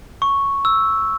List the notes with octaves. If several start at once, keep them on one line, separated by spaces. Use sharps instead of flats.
C#6
E6